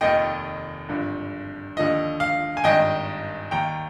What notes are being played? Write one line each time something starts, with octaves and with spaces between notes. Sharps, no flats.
F1 D#2 D#3 D#5 G5
G#1 G2 D3 F3
D#2 D3 F3 D#5
F5
G#5
G#1 G2 D#3 D#5 G5
D#2 D#3 G5 A#5